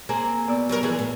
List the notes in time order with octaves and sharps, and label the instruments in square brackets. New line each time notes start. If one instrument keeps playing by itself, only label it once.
[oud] A#3 C4 G#4 [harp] A#5
[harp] B2 D5 E6
[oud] F#3 G3 A#4
E3 F3 G#4
A2